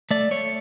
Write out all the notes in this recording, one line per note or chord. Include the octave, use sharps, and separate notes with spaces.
A3 D5
A3 C#5